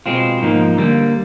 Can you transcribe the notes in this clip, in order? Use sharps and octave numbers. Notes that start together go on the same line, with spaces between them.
B2 G#3 C4 F4
G#2 F3 A#3 D#4
D3 G3 A#3